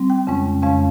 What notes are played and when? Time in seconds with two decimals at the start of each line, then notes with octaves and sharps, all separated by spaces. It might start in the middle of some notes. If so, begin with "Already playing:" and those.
Already playing: G3 C4
0.10 G5
0.27 F2 C#3 G#3 C#4
0.62 F2 C#3 G#3 C#4 F5